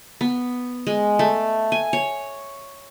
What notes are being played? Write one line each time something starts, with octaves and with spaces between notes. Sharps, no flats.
B3
G#3
A3
G#5
C#5